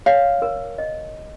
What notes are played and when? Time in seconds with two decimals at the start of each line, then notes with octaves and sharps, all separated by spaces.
0.06 C#5 F5
0.42 A#4
0.78 D#5